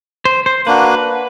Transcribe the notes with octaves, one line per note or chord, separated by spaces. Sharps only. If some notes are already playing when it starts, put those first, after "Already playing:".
C5
C5
A#3 D4 F#4 B4